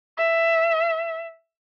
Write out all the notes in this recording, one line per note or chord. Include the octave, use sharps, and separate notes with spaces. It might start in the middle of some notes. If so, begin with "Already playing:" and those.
E5